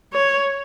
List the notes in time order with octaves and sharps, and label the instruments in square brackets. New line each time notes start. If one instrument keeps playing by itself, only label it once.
[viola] C#5